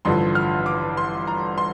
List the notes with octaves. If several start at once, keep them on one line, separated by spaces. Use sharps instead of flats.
A1 G2 D3 F3 C6
F6
D6
C6
A#5
C6